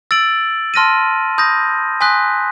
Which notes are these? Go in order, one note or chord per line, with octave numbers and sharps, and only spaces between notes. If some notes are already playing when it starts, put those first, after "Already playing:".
E6 A6 D7 F#7
A5 C6 F6 A#6 D#7
B5 D#6 G6 A#6
G#5 C6 D#6 F#6 B6